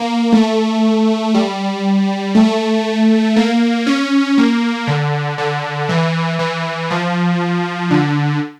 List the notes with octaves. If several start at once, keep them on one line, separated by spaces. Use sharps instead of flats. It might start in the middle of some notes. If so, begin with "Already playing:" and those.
Already playing: A#3
A3
G3
A3
A#3
C#4
A#3
D3
D3
E3
E3
F3
D3